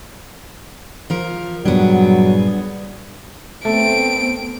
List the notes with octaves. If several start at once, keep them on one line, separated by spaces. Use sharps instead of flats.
F3 A#4
G2 A#2 F#3 G3 B3 D4 G#4
A3 B3 C4 D7